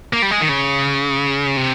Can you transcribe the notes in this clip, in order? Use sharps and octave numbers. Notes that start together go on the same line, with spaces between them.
A#3
G3
G#3
D#3
C#3
C3